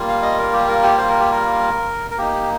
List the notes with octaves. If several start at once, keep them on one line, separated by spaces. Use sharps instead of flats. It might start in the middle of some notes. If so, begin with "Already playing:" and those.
Already playing: G3 A#3 F4
F5
D#5
A#4
G4
A#4
G4
C5
A#4
G4
A#4
A#4
A#3 D#4 G4